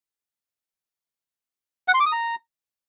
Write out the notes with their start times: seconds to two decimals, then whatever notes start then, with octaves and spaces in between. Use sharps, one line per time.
1.88 F#5
1.94 C6
2.00 D6
2.06 D#6
2.12 A#5